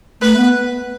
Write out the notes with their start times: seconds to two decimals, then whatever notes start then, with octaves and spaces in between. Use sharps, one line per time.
0.22 A3 B4
0.37 B3